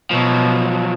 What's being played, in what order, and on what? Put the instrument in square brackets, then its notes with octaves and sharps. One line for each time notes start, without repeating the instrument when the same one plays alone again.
[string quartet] B2 [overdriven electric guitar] F3 F#3